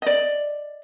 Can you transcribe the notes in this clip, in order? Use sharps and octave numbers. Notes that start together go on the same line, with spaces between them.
D5 D#5